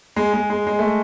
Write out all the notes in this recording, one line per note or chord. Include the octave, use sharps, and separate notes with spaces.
G#3
G#3
G#3
G#3
A3